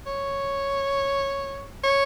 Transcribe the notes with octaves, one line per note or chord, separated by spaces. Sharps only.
C#5
C#5